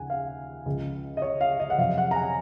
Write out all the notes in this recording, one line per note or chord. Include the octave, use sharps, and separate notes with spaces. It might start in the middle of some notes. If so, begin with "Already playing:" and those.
Already playing: D#2 C#3 F3 F#5 G#5
F5
C#2 C#3 F3
D#5
C#5
F5
D#5
F#5
F2 C3 F#3 F5
F#5
A#5
G#5